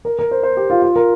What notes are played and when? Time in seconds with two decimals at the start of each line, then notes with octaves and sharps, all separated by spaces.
0.05 A#4
0.19 A#4
0.31 C5
0.43 C5
0.57 G4
0.70 F4
0.82 F4
0.96 A#4